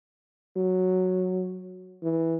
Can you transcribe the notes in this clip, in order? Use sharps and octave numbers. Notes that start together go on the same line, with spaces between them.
F#3
E3